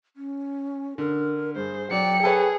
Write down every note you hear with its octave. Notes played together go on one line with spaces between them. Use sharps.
C#4
D3 A#4
G2 G#4 C5
F#3 D5 G5 C#7
G#4 A4 B4 C#5